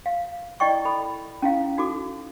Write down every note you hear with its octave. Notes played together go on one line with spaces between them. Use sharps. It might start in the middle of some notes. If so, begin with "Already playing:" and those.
F5
E4 D5 D#5 G5 C#6
A4 B5
C#4 E4 F5
D#4 F#4 A4 D6